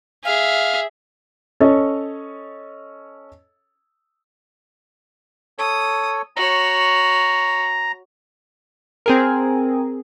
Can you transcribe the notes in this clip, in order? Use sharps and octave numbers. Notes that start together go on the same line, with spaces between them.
G#4 E5 F5
C#4 A4 C#5 D#5
A4 C#5 D#6
F#4 C#5 A#5
C4 G#4 A#4